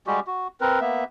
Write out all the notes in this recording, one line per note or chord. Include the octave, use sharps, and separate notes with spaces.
G3 G#3 F#4 G4
F#4
C4 A#4 B4
A#3 B3 E5